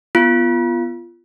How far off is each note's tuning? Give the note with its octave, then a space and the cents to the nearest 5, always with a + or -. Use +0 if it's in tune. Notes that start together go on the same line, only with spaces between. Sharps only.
B3 +0 F4 -20